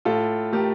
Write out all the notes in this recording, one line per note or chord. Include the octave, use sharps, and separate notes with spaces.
A2 F4 A4
A3 G4 A#4